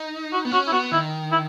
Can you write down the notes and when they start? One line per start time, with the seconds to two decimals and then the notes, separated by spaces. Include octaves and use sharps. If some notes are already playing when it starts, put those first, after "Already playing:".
Already playing: D#4
0.32 F#4
0.45 B3
0.52 C#4 F#4
0.67 E4
0.72 B3 F#4
0.92 D#3 E4
1.32 E4